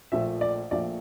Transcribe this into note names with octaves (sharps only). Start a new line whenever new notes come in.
A#1 A#2 A3 E5
D5
A#1 A#2 A3 D5